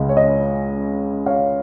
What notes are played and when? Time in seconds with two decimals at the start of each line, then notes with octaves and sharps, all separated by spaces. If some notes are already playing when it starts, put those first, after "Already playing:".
Already playing: C#2 C#3 G#3
0.09 C#5
0.17 D#5
1.26 C#5 F5